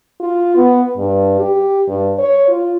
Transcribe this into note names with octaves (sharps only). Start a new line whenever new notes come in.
F4
B3
G2
G4
G2
C#5
F4